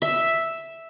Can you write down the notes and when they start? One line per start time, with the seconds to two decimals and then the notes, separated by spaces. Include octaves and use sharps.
0.02 E5